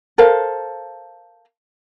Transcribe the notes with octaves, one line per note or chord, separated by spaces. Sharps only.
A4 A#4 C5 F5